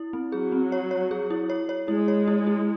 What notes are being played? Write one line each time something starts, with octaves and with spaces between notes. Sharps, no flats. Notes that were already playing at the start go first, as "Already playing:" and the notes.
Already playing: E4
C4
F#3 G#4
C4
C#5
C#5
G#4
E4
C#5
C#5
G#3 E4
C#5
E4
E4